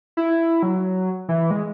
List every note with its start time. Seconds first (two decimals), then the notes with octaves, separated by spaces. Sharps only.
0.17 E4
0.63 F#3
1.29 E3
1.51 G#3